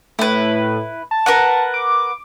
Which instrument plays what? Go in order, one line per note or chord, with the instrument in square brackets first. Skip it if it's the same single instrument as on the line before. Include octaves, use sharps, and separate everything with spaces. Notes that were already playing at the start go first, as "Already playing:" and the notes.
[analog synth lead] A2 [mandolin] E4 B4
[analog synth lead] A5
[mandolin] A#4 B4 F#5
[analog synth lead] D6